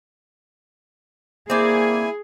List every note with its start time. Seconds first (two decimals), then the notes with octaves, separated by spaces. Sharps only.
1.50 A#3 C4 E4 G#4 D5 G#5